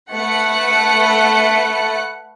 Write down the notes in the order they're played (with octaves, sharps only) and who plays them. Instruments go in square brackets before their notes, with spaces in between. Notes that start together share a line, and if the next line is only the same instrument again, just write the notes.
[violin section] A3 B4 F#5 F#6 C#7